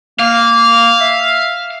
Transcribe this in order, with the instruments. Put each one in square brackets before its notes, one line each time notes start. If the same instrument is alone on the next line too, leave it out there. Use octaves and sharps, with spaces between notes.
[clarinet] A#3 [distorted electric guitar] F5
[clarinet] E5